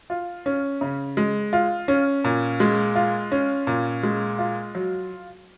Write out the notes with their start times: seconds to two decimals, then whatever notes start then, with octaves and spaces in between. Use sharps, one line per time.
0.10 F4
0.46 C#4
0.81 C#3
1.17 G#3
1.53 F4
1.88 C#4
2.24 A#2
2.60 G#3
2.95 F4
3.32 C#4
3.67 A#2
4.03 G#3
4.39 F4
4.75 F#3